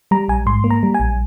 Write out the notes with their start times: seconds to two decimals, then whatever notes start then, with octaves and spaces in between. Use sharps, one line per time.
0.11 G3 A#5
0.28 A#1 G#5
0.46 G#2 C6
0.64 A#3
0.71 A#5
0.83 G3
0.94 G#5
1.00 A#1